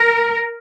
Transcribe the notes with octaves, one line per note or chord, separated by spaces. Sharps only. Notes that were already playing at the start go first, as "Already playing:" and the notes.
Already playing: A#4